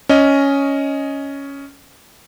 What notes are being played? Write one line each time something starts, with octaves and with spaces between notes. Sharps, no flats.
C#4 D#5